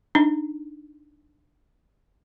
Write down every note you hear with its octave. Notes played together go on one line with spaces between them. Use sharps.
D4 D#4